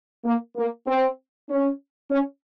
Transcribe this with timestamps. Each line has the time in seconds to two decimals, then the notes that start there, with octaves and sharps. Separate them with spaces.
0.24 A#3
0.56 A#3
0.87 C4
1.49 C#4
2.10 C#4